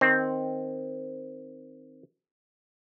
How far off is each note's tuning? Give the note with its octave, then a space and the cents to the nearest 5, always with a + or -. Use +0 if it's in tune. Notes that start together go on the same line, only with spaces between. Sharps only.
D#3 +0 C4 +0